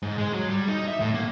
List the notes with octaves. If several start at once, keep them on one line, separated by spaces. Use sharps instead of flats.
G#2
G#3
F#3
G3
D#4
E5
A2
A#3